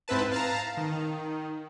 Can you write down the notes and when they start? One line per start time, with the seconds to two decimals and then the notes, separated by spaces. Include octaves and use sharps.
0.08 G#2 C4 E4 B4 A5
0.32 F5 A5 A#5
0.77 D#3